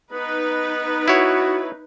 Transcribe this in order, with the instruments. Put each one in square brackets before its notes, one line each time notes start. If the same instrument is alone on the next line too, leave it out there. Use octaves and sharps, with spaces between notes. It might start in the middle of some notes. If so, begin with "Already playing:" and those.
[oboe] B3 [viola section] D#4 B4
[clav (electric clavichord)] E4 C#5 [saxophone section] F#4